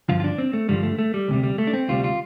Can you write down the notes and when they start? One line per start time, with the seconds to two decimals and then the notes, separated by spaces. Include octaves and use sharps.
0.09 G2 D3 F3 F4
0.20 F4
0.24 D4
0.38 C4
0.53 A3
0.68 G2 D3 F3 G3
0.83 A3
0.99 A3
1.14 G3
1.28 D2 C3 G3
1.44 G3
1.58 A3
1.67 D4
1.74 C4
1.88 D2 C3 G3 F4
2.04 F4